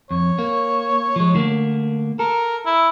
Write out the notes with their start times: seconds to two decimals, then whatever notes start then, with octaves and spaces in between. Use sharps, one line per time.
0.11 F2 C#5
0.39 A#3
1.16 F3 G#3
1.34 D3 A3 A#3
2.19 A4 A#4
2.66 E4